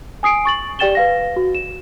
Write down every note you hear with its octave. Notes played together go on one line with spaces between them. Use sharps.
G#5 D#6 C7 D7
C#6 A6 F#7
G4 D5 G5 A6 E7 G7
B4 F5 A#6
F#4
E7